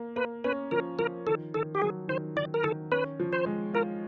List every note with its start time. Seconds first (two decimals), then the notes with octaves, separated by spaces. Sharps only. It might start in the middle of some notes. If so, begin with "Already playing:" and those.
Already playing: A#3
0.16 A#3 B4
0.44 C#4 B4
0.71 F3 A#4
0.99 F3 A#4
1.27 D#3 A4
1.54 D#3 A4
1.75 G4
1.82 F#3 G#4
2.08 D#3 C5
2.36 D#3 D5
2.54 A#4
2.64 D#3 A4
2.92 C#4 B4
3.20 F3
3.33 C5
3.46 G#3
3.74 F4 A#4